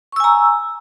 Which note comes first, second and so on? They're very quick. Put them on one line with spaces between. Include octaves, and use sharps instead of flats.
C#6 E6 G#5 A#5